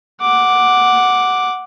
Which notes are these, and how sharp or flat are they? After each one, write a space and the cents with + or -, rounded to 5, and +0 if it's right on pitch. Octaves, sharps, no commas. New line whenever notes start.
F#5 +0 D6 +0